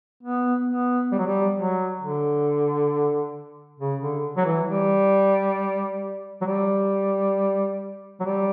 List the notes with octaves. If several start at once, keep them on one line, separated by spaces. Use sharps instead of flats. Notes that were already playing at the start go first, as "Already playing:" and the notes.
B3
B3
G3
F#3
G3
F#3
D3
C#3
D3
F#3
E3
G3
F#3
G3
F#3
G3